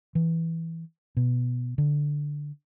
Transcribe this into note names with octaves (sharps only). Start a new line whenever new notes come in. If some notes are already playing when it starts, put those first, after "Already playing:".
E3
B2
D3